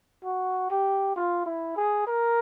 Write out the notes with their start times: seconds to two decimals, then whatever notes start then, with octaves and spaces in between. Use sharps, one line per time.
0.25 F#4
0.70 G4
1.16 F4
1.46 E4
1.76 G#4
2.07 A#4